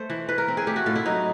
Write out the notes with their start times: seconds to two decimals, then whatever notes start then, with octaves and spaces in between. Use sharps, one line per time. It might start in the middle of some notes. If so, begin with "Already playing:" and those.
Already playing: A3 C5
0.10 E3
0.29 E3 B4
0.38 A#4
0.48 C4
0.57 G#4
0.67 A3 G4
0.76 F#4
0.86 A2 F4
0.96 E4
1.05 F#3 D#4